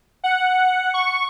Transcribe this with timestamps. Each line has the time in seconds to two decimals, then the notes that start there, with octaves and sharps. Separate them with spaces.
0.24 F#5
0.94 C#6